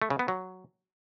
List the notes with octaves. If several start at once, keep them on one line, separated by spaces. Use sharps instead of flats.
A3
C#3
B3
F#3